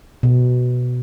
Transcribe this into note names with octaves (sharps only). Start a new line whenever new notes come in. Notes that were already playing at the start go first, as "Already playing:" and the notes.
B2